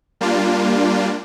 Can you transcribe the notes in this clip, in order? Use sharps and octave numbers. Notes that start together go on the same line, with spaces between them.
G3 A#3 D4 F4